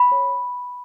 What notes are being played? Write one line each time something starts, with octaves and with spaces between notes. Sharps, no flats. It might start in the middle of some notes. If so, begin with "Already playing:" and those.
Already playing: B5
C#5